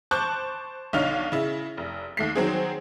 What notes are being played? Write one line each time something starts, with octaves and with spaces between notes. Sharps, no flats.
C5 A5 C#6 D6 F#6 G6
B1 D3 D#4 C#5 F5 F6
C#3 E4
F1
D#2 A3 C7
D#3 F#3 C4 G#4